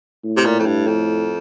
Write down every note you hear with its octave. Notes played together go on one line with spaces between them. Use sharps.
A2
C3
A#2
F2
G2
F2